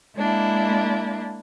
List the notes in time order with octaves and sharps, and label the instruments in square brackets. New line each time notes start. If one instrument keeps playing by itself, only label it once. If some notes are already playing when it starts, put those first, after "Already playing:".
[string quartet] G#3 A#3 D4 E4